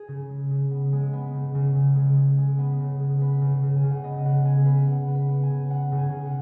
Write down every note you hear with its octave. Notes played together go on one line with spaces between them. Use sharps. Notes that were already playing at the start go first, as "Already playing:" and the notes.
Already playing: G#4
C#3
G#3
C#3
B3
G#3
B3
C#3
C#3
C#3
G#3
G#3
G#3
B3
C#3
G#3
B3 B4
C#3
C#3
G#5
C#3
F#5
B3 D#5
C#3 F#5
B3 G#5
G#4
B3 B4
C#3 F#5
B3
B4
B3
G#5
C#3
B3 F#5
C#3
G#5
C#3
F#5